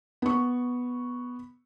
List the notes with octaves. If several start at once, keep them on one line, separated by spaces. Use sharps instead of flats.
B3 C#6